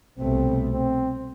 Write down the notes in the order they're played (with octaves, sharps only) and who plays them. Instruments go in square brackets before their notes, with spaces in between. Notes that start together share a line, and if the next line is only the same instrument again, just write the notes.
[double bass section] C2 B2 A3 [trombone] C4
[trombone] C4